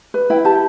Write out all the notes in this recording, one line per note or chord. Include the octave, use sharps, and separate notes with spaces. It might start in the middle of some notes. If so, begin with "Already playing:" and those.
B4
E4 G5
G4 A5